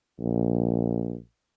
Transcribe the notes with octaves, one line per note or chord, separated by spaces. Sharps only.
A#1